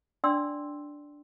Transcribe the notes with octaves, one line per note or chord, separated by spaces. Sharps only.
D4 D5 G5 C6 E6